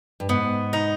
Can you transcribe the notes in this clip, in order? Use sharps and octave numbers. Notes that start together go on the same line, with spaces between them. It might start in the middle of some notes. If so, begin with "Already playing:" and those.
G2
G#2 B3
D#4